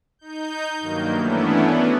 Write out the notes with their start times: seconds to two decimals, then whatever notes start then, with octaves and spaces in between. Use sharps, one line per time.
0.19 D#4 G6
0.80 G2 D#3 F#3 A#3
1.17 E3 A3 B3 C#4 D4 E4
1.62 B3 F#4 G#4